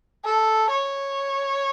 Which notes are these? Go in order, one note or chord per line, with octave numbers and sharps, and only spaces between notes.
A4
C#5